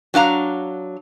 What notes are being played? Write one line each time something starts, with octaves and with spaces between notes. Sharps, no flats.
F#3 D4 F5 A#5